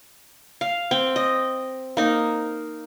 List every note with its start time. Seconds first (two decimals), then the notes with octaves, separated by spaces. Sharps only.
0.61 F5
0.91 C4
1.16 D#5
1.97 A#3 D#4